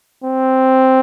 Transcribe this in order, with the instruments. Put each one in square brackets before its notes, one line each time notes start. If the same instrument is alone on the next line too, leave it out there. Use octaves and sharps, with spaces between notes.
[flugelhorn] C4